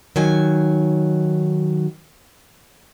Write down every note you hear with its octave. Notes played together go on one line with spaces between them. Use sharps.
D#3 F#3 G#5